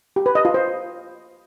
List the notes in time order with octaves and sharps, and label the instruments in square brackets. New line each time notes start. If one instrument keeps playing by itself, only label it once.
[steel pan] G4
B4
D#5
F4
C5